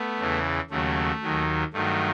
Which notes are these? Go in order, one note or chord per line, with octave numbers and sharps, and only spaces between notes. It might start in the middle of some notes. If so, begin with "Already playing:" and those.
Already playing: A3 B3
E2 C#3 E3
D#2 C#3 F#3 A3
D#2 D#3 F#3
G2 D#3 F#3 A3